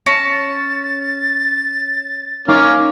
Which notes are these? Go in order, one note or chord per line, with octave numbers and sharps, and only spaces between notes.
C#4 A5 A#6
A6
A#3 C#4 D#4 F5 D6 F6